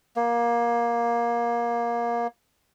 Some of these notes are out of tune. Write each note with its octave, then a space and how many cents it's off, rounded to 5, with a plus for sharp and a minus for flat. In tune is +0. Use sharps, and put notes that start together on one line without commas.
A#3 +20